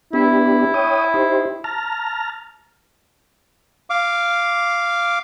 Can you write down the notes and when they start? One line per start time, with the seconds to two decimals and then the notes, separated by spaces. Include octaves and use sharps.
0.13 B3 D4 E4 G4
0.74 C#5 G5 D#6
1.14 D#4 G4 C5
1.64 A5 A#5 F6
3.90 F5 D6